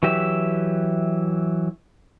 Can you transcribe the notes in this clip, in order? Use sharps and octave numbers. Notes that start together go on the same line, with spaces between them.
E3 F#3 G4 E5